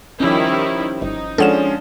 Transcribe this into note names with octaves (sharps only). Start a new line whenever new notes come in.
D#3 F3 G3 C#4 E4
G1 D#4
F3 G#3 C#4 D4 A4 F#5 E7